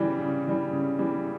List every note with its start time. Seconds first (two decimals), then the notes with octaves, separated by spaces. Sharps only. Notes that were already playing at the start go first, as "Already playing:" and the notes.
Already playing: C#3 E3 G3
0.19 C#3
0.46 E3 G3
0.73 C#3
0.99 E3 G3